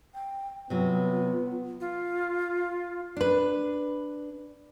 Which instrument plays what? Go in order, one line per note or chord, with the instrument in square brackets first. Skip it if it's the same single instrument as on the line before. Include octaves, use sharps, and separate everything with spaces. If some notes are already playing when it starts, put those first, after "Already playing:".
[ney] G5
[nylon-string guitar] C3 F#3 [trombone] B3 [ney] F4
[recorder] F4
[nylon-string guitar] D4 B4